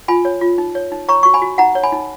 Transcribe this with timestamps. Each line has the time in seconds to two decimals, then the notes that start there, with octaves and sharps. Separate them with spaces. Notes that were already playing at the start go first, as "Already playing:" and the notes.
0.08 F4 G#5 B5
0.25 C#5
0.41 F4
0.58 D#4
0.75 C#5
0.92 D#4
1.08 C#5 A#5 C#6
1.23 F#4 C#6
1.34 G#5 B5
1.42 F#4
1.58 D#4 F#5 A#5
1.75 C#5
1.83 G#5 B5
1.92 D#4